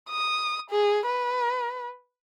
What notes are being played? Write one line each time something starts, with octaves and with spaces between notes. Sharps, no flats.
D#6
G#4
B4